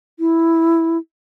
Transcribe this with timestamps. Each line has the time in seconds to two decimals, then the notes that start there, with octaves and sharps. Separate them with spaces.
0.20 E4